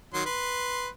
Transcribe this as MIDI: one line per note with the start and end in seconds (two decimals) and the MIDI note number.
0.14 0.24 51
0.14 0.24 54
0.14 0.24 84
0.26 0.88 71
0.26 0.88 84